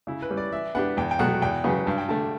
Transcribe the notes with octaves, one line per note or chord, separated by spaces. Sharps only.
C#3 E4
B4
G3 C#4 G4
D5
E3 E5
B3 D4 G4 F#5
E2 G5
G5
B2 F#3 A3 F#5
E2 G5
C#3 F#3 B3
G2 A5
G5
D3 A3 A5